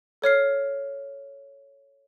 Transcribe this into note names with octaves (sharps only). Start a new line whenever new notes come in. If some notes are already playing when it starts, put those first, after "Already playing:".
A4 C#5 F6 C7